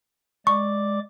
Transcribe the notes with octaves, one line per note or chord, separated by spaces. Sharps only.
G#3 D5 C#6 D6